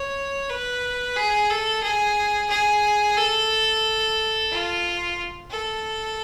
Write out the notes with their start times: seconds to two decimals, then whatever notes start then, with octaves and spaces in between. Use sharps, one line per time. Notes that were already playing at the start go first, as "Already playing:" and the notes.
Already playing: C#5
0.49 B4
1.16 G#4
1.50 A4
1.83 G#4
2.50 G#4
3.17 A4
4.51 F4
5.51 A4